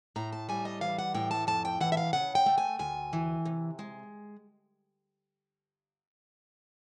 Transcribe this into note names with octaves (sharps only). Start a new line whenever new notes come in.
A2 A#5
A5
G3 G#5
D#5
E3 F5
F#5
A2 G5
A5
F2 A5
G5
E3 F#5
E5
F5
C#3 F#5
G5
A3
G#5
D2 G#5
E3
C3
G#3